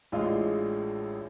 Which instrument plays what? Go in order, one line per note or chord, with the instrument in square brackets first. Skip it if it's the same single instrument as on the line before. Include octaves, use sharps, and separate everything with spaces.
[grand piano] A1 A2 G#3 D4 F4